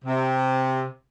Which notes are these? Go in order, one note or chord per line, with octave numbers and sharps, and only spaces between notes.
C3